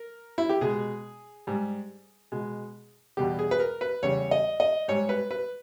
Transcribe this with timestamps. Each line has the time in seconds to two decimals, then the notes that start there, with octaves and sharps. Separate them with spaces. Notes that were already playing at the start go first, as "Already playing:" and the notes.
Already playing: A#4
0.38 E4
0.49 G4
0.61 B2 G#3 G#4
1.47 G#2 G3
2.32 B2 G#3
3.17 E2 B2 G3 G4
3.39 G#4
3.51 B4
3.60 A#4
3.81 B4
4.02 E2 C#3 G3 C#5
4.31 D#5
4.60 D#5
4.88 G#2 G3 C#5
5.09 B4
5.31 B4